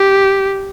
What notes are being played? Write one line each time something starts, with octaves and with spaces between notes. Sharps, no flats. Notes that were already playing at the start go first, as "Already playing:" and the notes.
Already playing: G4